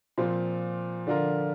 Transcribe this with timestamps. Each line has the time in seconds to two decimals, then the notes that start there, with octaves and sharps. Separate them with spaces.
0.18 A#2 F3 C4
1.07 D3 F3 D4 F4 A#4